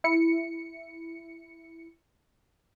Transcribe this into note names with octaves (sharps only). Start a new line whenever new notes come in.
E4 C#7